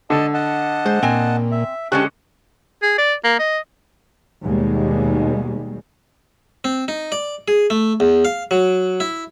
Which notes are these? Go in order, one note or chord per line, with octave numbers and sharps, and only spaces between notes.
D3 D#5 A5
D#5 F#5 A5
G#3 C5
A#2 C4 G#5
E5
D3 G#3 C#4 G4 A5 C#6 F#6
G#4
D5
A#3
D#5
D#2 B2 G3 G#3
C4
D#4
D5
G#4
A3
E2
F5
F#3
E4